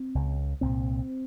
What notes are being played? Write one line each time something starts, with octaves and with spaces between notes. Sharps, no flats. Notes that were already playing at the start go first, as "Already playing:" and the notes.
Already playing: C4
C#2 C#3
C2 A#2 C4